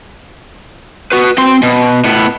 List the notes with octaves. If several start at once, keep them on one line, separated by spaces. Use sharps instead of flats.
F#4 B4
C4 C6
B2
A2 B3